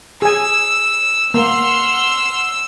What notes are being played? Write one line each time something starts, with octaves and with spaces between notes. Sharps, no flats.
G#4 G#5 E6
A#3 F#5 C6 E6 F6